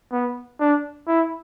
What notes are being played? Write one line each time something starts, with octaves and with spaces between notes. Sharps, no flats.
B3
D4
E4